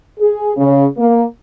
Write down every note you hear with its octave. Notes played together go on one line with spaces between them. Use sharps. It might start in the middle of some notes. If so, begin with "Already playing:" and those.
G#4
C#3
A#3